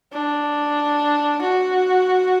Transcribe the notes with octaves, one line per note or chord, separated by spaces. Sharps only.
D4
F#4